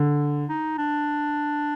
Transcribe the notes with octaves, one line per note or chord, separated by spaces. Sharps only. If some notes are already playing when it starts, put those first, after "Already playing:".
Already playing: D3
D#4
D4